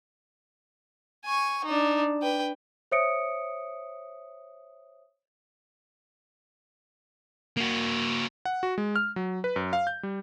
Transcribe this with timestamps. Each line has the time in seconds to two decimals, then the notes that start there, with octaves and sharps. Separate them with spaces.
1.25 G#5 C#6
1.65 D4 D#4
2.22 B4 G5
2.92 C5 C#5 E5 D#6 C#7 D7
7.57 A#3 F#4
8.45 F#5
8.63 F#4
8.78 G#3
8.96 F6
9.16 F#3
9.44 B4
9.56 F#2
9.73 F5
9.87 G6
10.03 G3